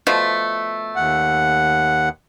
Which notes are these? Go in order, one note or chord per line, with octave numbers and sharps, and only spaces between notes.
B2 F3 A3
D#2 F#5